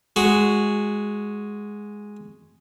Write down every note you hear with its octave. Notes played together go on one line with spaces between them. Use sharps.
G#3 F#4